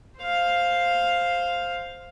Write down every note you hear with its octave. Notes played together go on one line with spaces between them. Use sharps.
C5 F5